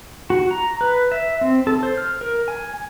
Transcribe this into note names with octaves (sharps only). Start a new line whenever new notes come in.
F#4
A#5
B4
E5
C4
A4
C5
F6
A#4
G#5